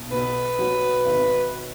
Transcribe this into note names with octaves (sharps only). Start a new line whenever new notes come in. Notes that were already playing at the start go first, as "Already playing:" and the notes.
Already playing: B1
B2 B4
F#3
G#1